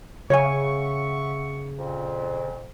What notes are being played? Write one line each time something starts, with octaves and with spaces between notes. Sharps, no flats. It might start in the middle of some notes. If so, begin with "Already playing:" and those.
C#3 C#5 E5 F#5 G#5 C#6
F2 A#2